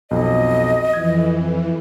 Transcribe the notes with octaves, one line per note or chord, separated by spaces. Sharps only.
B1 F2 D#5
F2 E3 G#6